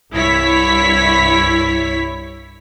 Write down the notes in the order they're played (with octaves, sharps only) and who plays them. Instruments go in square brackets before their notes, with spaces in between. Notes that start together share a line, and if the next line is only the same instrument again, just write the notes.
[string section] C2 G2 E4 C#5 B6